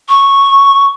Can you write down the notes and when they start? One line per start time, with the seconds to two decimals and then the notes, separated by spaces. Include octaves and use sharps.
0.09 C#6